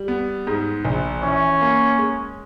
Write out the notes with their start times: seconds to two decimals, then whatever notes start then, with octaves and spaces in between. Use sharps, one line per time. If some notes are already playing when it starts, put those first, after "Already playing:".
Already playing: G3
0.08 B3
0.47 G#2
0.85 A#1
1.22 E3 C#4
1.61 A#3
1.99 G#3